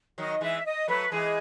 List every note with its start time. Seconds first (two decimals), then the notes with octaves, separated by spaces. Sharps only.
0.18 D#3 F#3 D#5
0.41 E3 G#3 E5
0.65 D#5
0.88 F#3 A3 B4
1.12 E3 G#3 G#4